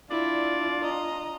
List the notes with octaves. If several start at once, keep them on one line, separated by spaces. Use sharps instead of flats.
D4 E4 F4 D5
D#5 A#5